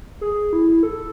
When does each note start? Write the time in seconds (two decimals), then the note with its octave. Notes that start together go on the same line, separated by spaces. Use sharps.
0.21 G#4
0.53 E4
0.83 A4